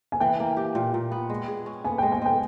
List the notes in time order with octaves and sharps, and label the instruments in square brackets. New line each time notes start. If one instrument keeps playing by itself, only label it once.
[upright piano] G#5
[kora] E3 [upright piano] G5
[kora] A#3
G4
A#2
A#2
B3
G#3
G#4
C#4
[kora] B3 [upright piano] G#5
[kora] G#3 [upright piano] G5
[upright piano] G#5
[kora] G#3 [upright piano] G5